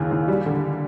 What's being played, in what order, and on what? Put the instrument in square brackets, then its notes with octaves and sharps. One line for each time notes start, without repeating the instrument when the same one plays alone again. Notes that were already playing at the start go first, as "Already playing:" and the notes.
Already playing: [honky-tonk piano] D#2 C#3 E3
D#2
G3
D3